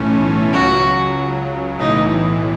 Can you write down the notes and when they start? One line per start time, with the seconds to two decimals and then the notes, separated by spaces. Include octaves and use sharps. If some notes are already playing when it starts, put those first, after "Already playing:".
Already playing: B1 A2 E3 A3 C#4
0.53 C#2 C#3 F#3 F#4
1.79 B1 A2 E3 D#4